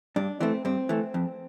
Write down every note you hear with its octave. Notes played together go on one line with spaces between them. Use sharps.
G2 D4
E3 A3 C4
G2 C4
E3 A3
F2